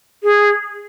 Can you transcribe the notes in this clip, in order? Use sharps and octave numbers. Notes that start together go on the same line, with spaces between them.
G#4